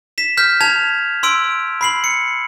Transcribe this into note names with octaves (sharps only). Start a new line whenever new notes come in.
B6 E7
F6 G6 B6
A5 G#6 F7
C6 E6 D7
B5 C7 F#7
C#7